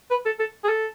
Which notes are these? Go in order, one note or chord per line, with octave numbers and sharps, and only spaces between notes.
B4
A4
A4
G#4
A4